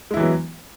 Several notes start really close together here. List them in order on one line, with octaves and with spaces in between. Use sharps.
G#3 E4 E3 F#3 B3